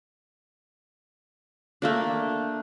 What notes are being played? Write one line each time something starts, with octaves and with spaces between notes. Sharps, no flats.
A3 A#3 D4